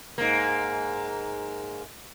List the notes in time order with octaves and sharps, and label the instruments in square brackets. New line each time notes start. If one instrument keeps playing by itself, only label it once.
[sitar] G#2 A#3